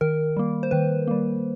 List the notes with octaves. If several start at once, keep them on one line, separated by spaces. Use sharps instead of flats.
D#3 A#4
G3 A#3
C5
D#3 B4
G3 A#3